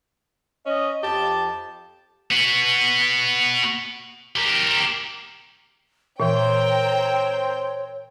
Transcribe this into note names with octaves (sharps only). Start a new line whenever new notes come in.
C#4 D#5
F2 G4 A5
B3 F#4
G4 A#4
A#2 E3 C4 A#4 C5 C#5 G5